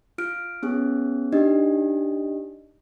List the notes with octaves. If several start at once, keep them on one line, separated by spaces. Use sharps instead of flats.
F4 F6 D7
B3 C#4 G#4
D4 D#4 G4 D#5